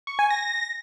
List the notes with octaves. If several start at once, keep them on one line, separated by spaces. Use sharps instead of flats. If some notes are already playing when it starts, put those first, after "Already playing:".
C#6
G#5
A#6